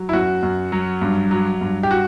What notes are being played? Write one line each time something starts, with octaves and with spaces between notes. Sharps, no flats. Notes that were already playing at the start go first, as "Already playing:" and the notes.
Already playing: F#3
E4
F#2 F#4
F#2
F#3
G2
F#3
G2
G4
F#4